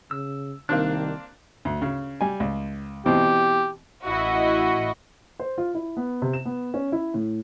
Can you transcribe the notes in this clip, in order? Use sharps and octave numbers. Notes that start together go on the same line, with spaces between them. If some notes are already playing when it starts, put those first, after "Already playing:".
C#3 E6
C2 D#3 A#3 C4 D4 F#6
D2
C#3
G3 G#5
C#2
B2 E3 C4 G4
A1 E4 F#4 D#5
C5
F4
E4
B3
C3
E7
B3
C#4
E4
A2